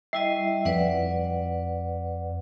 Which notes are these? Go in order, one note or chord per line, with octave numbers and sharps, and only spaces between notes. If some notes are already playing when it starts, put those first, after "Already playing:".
G3 E4 D#5 E5
F2 B4 D5 F#5